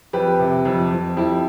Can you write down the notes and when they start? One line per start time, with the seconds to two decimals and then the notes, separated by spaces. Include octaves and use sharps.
0.13 F2 G4 B4
0.40 C3
0.65 F2
0.91 F2
1.17 F2 E4 G4